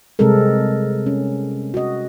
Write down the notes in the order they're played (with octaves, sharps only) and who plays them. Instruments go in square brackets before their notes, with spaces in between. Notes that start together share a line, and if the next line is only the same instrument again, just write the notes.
[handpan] C3 G3 G#3 C4 A4 A#4
C#4
F#4 D#5